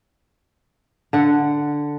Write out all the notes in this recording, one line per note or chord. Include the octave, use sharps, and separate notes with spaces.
D3 F#5